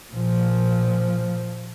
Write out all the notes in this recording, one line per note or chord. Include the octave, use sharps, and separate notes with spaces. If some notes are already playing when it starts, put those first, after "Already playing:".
A#2 F3